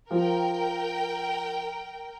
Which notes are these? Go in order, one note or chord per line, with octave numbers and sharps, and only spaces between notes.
F3 A#4 G5